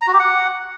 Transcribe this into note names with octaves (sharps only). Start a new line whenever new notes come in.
A#5
F#4
G4
F#5